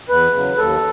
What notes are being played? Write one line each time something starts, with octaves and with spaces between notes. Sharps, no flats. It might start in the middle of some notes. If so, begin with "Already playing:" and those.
E2 B4
C#3 F#3
D#2 A4